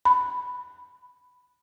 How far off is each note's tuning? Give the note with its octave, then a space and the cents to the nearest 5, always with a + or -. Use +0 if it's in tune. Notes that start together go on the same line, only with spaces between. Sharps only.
B5 +5